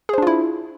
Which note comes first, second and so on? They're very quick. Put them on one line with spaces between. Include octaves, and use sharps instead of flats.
G#4 C5 D4 F4 E4